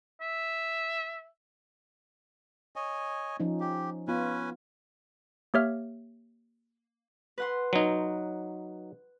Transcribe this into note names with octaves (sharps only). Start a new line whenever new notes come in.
E5
C#5 D#5 G#5
F3 C#4 D#4
G4
B3 C#4 F4 B4 G#5
A#3 G4 C#5 E5 F6
B4 F#5 C6
F#3 D#4